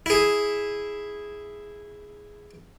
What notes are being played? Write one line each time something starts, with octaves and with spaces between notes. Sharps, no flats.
E4 G#4